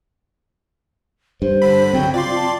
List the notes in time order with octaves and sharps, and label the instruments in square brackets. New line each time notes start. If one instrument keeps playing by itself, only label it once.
[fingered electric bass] G2 [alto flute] C5
[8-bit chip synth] D3 B5
[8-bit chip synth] C#2 F#3 [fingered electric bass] C4 [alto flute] G5
[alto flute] F4 [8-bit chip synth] D5 C6
[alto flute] A5